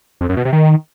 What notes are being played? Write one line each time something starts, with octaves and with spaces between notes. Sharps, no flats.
F2
F#2
B2
C3
D#3